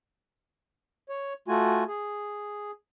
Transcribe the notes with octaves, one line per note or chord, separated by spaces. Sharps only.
C#5
A3 F4 F#4 G#5
G#4